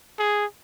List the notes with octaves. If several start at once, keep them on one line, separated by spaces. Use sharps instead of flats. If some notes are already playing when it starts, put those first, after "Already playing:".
G#4